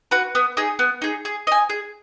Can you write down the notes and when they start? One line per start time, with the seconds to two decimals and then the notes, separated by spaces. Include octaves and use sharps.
0.11 F#4 B4
0.35 B3
0.57 D#4 G#4
0.79 B3
1.02 D#4 G#4
1.25 G#4
1.47 D#5 G#5
1.69 G#4